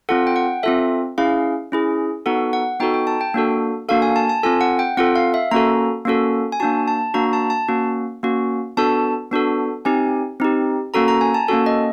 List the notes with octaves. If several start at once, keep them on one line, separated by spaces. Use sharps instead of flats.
C4 F4 A4 F#5
G5
F#5
C4 F4 A4 E5
C#4 E4 G#4 F5
C#4 E4 G#4
B3 D#4 F#4 A4 F#5
F#5
B3 D#4 F#4 A4 G5
G5
A5
G5
A#3 D4 F#4 A4
A#3 D4 F#4 A4 F5
G#5
A5
A5
C4 F4 A4 G#5
F#5
G5
C4 F4 A4 F#5
F5
E5
A#3 C#4 F#4 A4 A#5
A#3 C#4 F#4 A4
G#5
A#3 D4 F#4 A5
A5
A#3 D4 F#4 A#5
A5
A5
A#3 C#4 F#4
A#3 C#4 F#4
B3 D4 F#4 A4 A5
B3 D4 F#4 A4
C4 D#4 G4 G#5
C4 D#4 G4
A#3 C#4 F#4 A4 A#5
A#5
G#5
A5
A#3 C#4 F#4 A4 A5
D#5